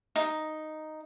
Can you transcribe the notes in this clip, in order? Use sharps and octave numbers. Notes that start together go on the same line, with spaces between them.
D#4